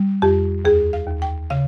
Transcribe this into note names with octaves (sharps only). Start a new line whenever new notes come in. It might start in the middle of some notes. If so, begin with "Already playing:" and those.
Already playing: G3
F2 G4
D#2 G#4
F5
D#2
G5
C#3 F5